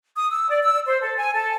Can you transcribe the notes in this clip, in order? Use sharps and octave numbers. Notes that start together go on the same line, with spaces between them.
D#6
E6
D5
E6
C5
A4
G#5
A4